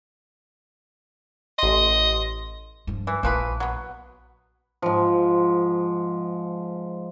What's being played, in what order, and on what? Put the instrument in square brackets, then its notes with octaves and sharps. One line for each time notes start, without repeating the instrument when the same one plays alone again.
[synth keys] A1 C6 [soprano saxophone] D#5
[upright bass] G2 F3
[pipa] E3
[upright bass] A#1 E4 [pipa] E3 F3 B4
[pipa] F#3 B3
[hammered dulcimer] G#2 F3